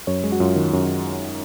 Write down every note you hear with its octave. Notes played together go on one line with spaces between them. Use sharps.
F#2 C#5
G#3
F#4
F#2 F4
D#3
F#2